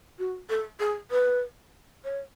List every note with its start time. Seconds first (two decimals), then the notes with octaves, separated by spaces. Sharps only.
0.19 F#4
0.50 A4
0.80 G#4
1.11 B4
2.04 C#5